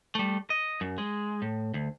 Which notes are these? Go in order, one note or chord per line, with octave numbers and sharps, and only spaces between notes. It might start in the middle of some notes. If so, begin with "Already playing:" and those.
G3 A3
D#5
F#2
G#3
A2
D2